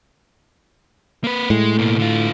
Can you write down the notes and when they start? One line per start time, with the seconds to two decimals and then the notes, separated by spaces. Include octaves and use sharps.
1.24 A#3 B4
1.50 A2 G#3
1.79 B2 A#3
1.99 D3 F4